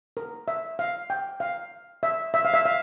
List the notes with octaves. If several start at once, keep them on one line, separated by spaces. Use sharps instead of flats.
A#4
E5
F5
G5
F5
E5
E5
F5
E5
F5